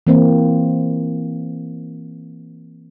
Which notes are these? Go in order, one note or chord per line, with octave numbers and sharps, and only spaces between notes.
E3 A#3 C4